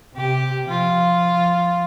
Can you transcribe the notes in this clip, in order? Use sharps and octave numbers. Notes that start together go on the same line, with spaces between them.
C3 G4
F3 F4